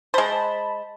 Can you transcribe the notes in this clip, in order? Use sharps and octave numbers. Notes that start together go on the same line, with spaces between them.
G#3 C5 A5 B5